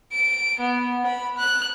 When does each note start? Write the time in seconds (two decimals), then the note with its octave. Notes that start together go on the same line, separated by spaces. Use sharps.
0.13 D7
0.60 B3
1.06 B5
1.38 F#6